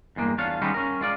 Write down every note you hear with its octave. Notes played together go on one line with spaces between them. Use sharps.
E2 G2 G#3 A#3
E2 D4 F4 C#5 F5
D#3 G3 G#3 B3 C#4 D#4
C#4 A#4
G#3 F4 D5